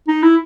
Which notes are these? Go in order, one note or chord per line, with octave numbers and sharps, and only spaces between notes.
D#4
E4